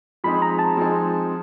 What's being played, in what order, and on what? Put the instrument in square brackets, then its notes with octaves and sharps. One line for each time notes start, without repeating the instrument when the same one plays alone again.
[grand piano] F3 G#3 C4 D#4 G#4 [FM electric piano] B5
[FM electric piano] A#5
A5
[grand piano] F3 G#3 C4 D#4 G#4